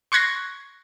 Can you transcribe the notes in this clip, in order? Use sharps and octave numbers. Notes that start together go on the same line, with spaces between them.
C6 C#6 F#6 G#6 A#6 C7